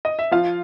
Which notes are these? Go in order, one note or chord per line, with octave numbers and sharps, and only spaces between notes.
D#5
E5
F3 F4 F5